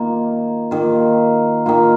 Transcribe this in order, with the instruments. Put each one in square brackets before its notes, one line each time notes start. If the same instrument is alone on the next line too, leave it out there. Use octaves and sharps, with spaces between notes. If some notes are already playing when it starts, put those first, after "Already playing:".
Already playing: [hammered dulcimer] D#3 A#3 F4
D#3 A#3 F4
D#3 A#3 F4